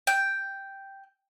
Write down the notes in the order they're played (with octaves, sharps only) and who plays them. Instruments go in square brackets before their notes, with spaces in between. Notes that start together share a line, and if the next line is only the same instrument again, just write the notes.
[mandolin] G5